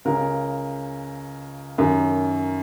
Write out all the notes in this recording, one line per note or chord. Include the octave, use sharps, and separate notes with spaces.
C#2 C#3 A#4
F#2 D#3